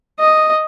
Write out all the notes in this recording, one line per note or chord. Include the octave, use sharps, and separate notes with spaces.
D#5